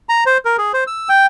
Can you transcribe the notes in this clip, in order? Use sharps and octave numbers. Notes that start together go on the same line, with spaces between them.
A#5
C5
A#4
G#4
C5
E6
G5